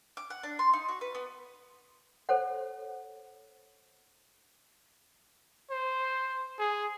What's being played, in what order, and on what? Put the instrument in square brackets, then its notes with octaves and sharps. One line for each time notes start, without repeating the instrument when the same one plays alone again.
[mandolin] D6
F#5
D4
C6
D#4
F#4
B4
B3
[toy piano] A4 C5 C#5 F#5
[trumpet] C5
G#4